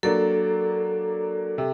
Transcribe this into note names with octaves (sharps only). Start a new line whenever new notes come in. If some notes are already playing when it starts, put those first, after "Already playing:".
F#3 A#3 D4 A4
C3